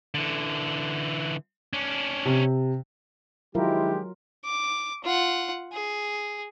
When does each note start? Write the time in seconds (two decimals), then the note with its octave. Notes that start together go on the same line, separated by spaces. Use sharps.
0.14 D3 E3
1.73 C#4 D4
2.25 C3
3.55 D#3 F3 F#3 G#3 E4 F4 G4 A#4
4.45 D6
5.04 F4 F#5
5.72 G#4